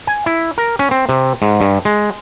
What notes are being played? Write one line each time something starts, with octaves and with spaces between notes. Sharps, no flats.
G#5
E4
A#4
C#4
C4
C3
G#2
G2
G#3